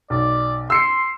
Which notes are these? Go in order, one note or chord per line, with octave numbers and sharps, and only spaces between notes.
B1 D5
C6 E6 C7 C#7